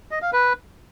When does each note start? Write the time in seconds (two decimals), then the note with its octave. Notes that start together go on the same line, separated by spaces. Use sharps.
0.11 D#5
0.22 F5
0.33 B4